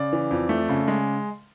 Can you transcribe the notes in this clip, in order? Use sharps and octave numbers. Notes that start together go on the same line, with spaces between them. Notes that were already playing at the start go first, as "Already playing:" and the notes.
Already playing: C#3 D5
E3
F2
A3
C#3
G#3